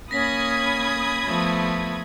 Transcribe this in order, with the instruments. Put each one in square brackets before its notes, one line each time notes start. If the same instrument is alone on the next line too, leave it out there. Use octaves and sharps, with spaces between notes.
[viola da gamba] A#3 [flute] C#4 [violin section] B5 D#6 G#6 [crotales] A#6 B6
[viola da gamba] F3 A3 B3